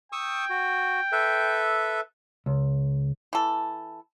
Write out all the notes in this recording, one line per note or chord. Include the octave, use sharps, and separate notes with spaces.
G5 C#6 D#6 E6
F#4
A4 B4 E5
C#2
E3 A4